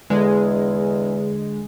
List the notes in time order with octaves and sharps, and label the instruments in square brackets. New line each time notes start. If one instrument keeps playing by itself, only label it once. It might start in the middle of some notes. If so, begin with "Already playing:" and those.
[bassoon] E2 [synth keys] D3 G#3